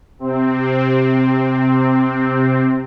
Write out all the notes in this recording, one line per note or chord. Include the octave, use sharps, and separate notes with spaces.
C3 C4